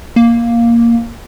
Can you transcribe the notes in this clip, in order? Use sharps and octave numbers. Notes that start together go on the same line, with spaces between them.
A#3